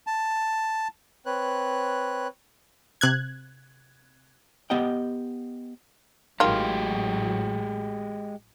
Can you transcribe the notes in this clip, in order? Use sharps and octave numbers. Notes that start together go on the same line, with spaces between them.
A5
C4 B4 C#5 F#6
C3 F#6 G#6
B3 G4 D#5 F#5 G5
A1 A2 D#3 F#3 G#3 F4 G4